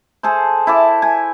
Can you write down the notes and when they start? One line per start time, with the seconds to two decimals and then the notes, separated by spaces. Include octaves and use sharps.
0.23 G#4 A4 C5
0.67 E4 A5 D6
1.02 G#5